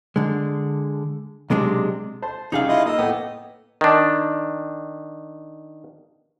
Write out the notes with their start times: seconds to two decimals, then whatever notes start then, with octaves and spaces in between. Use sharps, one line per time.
0.16 D3 G#3
1.50 B1 C3 G#3 D4
2.22 C5 A5 C6
2.52 C2 C#3 G3 D#4 G#4 F5
2.69 E4 F4 D#5
2.86 A#3 D#5 E6
2.99 A2 B3 G5
3.81 D#3 D4